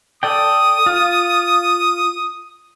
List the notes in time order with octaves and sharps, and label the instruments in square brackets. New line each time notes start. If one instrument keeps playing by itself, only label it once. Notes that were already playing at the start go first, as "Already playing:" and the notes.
[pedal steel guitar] A4 D5 G5 [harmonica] D#6
[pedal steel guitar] F4